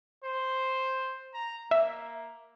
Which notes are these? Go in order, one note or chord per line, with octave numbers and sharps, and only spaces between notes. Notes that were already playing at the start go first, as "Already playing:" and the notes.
C5
A#5
A#3 E5